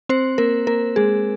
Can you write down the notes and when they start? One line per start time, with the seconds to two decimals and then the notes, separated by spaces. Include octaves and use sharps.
0.09 C4 C5
0.38 A#3 A#4
0.67 A#3 A#4
0.96 G#3 G#4